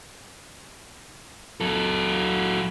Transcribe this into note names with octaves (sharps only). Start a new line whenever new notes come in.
F#3 A4